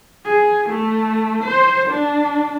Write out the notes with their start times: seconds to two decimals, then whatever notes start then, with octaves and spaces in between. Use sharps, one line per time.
0.25 G#4
0.69 A3
1.43 C5
1.89 D4